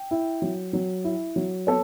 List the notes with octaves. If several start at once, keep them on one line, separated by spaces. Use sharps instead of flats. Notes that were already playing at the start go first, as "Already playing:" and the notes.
Already playing: G5
E4
F#3
F#3
E4
F#3
B3 A4 C#5